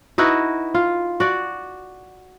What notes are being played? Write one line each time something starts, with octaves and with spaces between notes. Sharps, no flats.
D#4 E4 F#4 B4
F4
F#4 D5